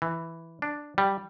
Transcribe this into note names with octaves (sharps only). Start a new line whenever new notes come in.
E3
D4
G3